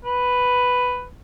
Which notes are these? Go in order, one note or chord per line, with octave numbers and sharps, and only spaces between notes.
B4